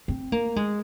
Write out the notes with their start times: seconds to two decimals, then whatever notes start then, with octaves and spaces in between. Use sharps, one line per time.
0.08 C4
0.32 A#3
0.56 G#3